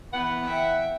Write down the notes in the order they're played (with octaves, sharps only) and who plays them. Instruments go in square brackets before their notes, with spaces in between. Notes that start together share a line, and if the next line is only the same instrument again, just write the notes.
[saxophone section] E3 B4 F#5 [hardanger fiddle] B3
[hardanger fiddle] E5 G5